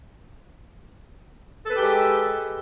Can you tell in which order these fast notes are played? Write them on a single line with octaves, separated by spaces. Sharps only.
A4 B4 G4 G#3